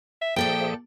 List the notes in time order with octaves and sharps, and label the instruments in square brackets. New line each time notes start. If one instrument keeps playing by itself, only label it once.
[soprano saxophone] E5
[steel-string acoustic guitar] A#2 A4 D5 [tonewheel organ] F3 G#4 E5 [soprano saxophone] G5